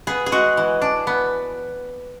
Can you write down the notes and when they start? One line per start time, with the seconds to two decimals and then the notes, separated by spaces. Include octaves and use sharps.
0.07 B3 G#4
0.26 G#4
0.32 G#3 F#4
0.57 E3
0.82 D4
1.07 B3